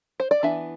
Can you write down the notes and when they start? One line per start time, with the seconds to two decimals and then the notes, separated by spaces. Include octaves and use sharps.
0.20 C5
0.31 D5
0.43 E3 B3 D4 E5